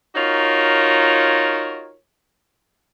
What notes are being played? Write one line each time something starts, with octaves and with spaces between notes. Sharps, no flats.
D#4 F4 F#4 A#4 C#5